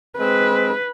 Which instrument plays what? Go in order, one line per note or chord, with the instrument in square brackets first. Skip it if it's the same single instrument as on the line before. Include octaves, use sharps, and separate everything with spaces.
[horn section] G#3 C4 [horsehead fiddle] B4